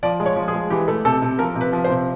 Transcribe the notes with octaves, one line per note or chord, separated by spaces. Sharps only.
F3 D5
G#3
C#5
F3
G#4
G#3
E3 G4
A3
C3 A4
C3
F3 A#4
C3
B4
F3
C5
C3